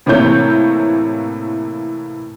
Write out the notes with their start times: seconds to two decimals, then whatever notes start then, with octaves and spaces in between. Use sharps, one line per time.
0.06 A2 C3 E3 A#3 C#5 G6